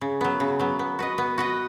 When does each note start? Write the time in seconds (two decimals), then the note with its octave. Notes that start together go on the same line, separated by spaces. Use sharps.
0.01 C#3
0.21 F#3 B3
0.40 C#3
0.59 F#3 B3
0.79 B3
0.99 F#4 B4 D#5
1.18 B3
1.38 F#4 B4 D#5